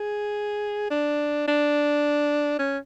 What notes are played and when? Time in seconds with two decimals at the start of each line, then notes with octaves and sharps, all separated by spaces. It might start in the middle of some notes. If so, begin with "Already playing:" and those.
Already playing: G#4
0.90 D4
1.48 D4
2.59 C#4